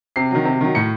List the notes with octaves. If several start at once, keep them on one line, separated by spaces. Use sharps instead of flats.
C3 C7
D#3 F#3
C3
D#3 F#3
A2 C#7